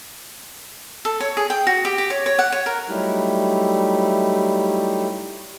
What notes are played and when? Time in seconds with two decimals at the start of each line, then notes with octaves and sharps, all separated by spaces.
1.05 A4
1.20 C#5
1.37 G#4
1.50 G5
1.67 F#4
1.85 G4
1.98 G4
2.10 C#5
2.26 C#5
2.39 F#5
2.52 C#5
2.66 A#4
2.88 F#3 G3 A3 D#4 E4 G4